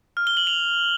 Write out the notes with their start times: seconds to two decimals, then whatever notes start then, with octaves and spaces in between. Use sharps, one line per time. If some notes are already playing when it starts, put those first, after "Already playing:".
0.17 F6
0.27 G7
0.37 F#7
0.47 F7